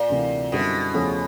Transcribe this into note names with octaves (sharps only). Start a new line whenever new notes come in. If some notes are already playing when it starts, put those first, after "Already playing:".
Already playing: A#2
D2 C3 E3
F#2 B2 D3 G3 C4 E4
E2 C#3 F3 A3 C#4